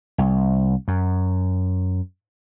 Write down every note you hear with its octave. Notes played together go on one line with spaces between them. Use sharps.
C2
F#2